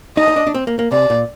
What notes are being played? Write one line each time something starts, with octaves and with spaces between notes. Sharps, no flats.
D#4 D#5
D#4
D4
D4
C4
A#3
A#3
C3 D5
A#2